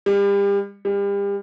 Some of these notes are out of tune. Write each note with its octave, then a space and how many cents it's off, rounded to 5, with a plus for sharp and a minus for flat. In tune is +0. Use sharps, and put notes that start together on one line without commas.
G3 +35
G3 +35